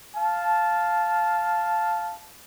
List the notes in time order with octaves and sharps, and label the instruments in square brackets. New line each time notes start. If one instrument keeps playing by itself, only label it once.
[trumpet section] F5 A5